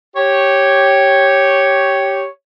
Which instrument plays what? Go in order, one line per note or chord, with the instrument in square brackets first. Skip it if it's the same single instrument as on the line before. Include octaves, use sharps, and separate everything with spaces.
[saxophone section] G4 C#5